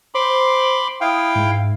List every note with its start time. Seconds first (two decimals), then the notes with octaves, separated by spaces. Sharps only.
0.15 C5 B5 C6 D6
1.01 E4 F5 G5 D#6
1.35 G#2